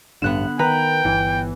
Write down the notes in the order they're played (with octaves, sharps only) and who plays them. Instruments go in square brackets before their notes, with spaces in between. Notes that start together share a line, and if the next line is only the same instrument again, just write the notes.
[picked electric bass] A1 G2 [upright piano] D3 [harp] B3 F#6 E7
[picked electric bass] D#3 [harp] B4 [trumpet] G5 [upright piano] A#5
[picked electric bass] G1 [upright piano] E3